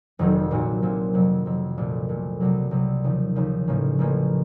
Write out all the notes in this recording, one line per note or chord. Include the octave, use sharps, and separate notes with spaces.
F1 F2 D#3 F#3 C4
A#1 A#2 F#3 C4 F#4
A#1 A#2 F#3 C4 F#4
F2 C3 F#3
F2 C3 F#3
A#1 A#2 A3
A#1 A#2 A3
C2 C3 F#3
C2 C3 F#3
D#2 C#3 F3
D#2 C#3 F3
A1 A2 F3 A#3 C#4
A1 A2 F3 A#3 C#4